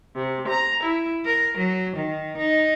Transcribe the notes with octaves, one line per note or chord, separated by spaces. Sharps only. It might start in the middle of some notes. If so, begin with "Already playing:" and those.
C3
A#5
E4
A#4
F#3
D#3
D#4